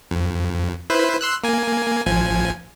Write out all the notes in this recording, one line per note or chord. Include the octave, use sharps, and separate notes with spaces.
F2
E4 B4 C5
C6 E6 F#6
A#3 G#5
A1 F3 G#5